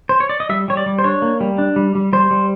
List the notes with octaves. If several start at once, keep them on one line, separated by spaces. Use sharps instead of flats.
C5
C#5
D5
D#5
G3 E5
G3 C#5
D5
G3
C5
D4 C#5
A#3
G3
D4
G3
G3
G3 C5
G3